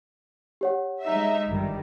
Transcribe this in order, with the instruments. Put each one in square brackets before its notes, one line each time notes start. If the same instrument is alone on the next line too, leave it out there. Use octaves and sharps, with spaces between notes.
[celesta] G4 C#5 F#5
[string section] G#3 D#4 E5
G1 D#3 G3